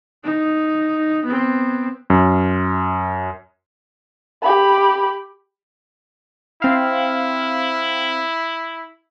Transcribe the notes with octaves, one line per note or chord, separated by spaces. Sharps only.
D#4
B3 C4
F#2
G4 B5
C4 E4 F5